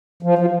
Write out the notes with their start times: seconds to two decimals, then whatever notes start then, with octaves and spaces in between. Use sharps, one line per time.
0.23 F3
0.38 F3